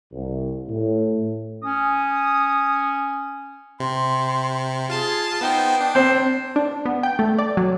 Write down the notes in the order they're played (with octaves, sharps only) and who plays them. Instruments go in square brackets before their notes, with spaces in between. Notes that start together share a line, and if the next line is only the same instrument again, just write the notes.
[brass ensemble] C2
A2
[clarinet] C#4 [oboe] D#6
[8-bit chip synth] C3 [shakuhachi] C6
[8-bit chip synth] F4 A5 C6 [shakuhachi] G#4
[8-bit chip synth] B3 D#4 C5 [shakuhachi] G5
[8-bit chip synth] D4
[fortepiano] C4 C5
[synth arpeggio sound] D4
B3
G5
A3
D5
F#3